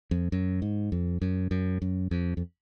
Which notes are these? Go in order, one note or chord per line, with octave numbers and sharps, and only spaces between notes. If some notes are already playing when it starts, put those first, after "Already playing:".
F2
F#2
G#2
F2
F#2
F#2
F#2
F2
F2